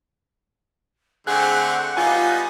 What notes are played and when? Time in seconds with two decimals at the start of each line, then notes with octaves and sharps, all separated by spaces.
1.27 D3 A3 C4 G#4 F#5 F#6
1.97 G3 B3 D#4 F4 G#5 F#6